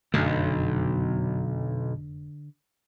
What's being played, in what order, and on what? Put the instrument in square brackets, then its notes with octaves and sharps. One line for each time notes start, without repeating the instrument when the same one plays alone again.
[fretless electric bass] F1 F#2 A3 [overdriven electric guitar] B1 [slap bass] D3